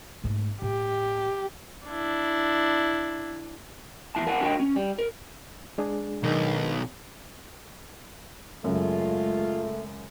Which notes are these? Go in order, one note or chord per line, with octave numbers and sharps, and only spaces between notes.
G#2 A3
A2 G4
D4 E4
E2 E3 E4 A5
A#4 F#5 G#5 A5
D4 F#4 A#4 D#5 G5
C#4
G3
A#4
G#3 D4 G#4
B1 D#3
F#2 C#3 G#3 A3 F4